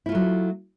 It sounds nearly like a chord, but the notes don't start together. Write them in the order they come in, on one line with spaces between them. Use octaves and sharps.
E4 F4 A3 F#3